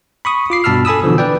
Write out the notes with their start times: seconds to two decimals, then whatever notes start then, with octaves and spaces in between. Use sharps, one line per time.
0.25 B5 C#6 D#6
0.50 F4 D6 C7
0.64 G2 B2 A5 B5 E6 F6
0.85 A4 G#5 B5 D#6 E6
1.04 B2 D3 E3 F3
1.18 B4 D5 G5